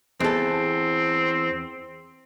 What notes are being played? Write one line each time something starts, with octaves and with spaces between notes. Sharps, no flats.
E2 C4 A4